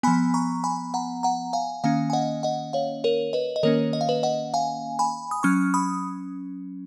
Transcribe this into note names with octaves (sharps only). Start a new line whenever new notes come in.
F3 B3 G#5 B5
A#5 C#6
G#5 B5
F#5 A#5
F#5 A#5
F5 G#5
D#3 A#3 C#4 F5 G#5
G#5
D#5 F#5
D#5 F#5
C#5 F5
A#4 C#5
B4 D#5
D#5
D#3 A#3 C#4 A#4 C#5
D#5
F5
B4 D#5
D#5 F#5
F5 G#5
G#5 B5
D#6
F#3 C#4 C#6 F6
B5 D#6